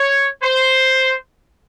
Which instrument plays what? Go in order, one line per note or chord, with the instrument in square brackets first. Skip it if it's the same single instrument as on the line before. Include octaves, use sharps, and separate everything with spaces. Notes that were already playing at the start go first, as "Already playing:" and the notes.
Already playing: [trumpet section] C#5
C5